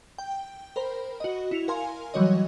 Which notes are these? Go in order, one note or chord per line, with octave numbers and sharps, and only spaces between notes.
G5
A#4 C5 B5
F#4 D#5
E4 C#7 F7
A#4 F5 G#5 C6
E3 F#3 G3 F#4 C#5 D#5